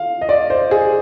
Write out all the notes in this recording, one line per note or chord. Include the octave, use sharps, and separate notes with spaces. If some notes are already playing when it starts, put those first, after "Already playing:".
Already playing: F5
D#5
D5
C5
G#4